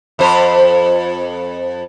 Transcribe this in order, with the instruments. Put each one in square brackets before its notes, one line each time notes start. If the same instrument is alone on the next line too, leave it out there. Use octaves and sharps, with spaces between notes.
[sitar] F2 C5